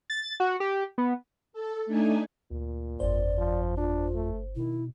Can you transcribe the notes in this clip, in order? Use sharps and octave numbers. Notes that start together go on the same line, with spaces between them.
A6
F#4
G4
B3
A4
A3 D4 D#4 G#5
D2 A#2
G1 F2 C5 D5
F3
D4 F4
A3
B2 D#3 E4